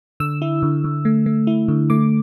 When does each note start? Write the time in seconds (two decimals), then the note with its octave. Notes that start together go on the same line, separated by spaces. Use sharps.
0.20 D3 E6
0.42 E4
0.63 D3
0.84 D3
1.05 A3
1.26 A3
1.47 E4
1.68 D3
1.90 A3 D6